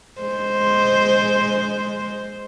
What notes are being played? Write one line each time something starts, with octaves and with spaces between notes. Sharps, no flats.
G#3 C5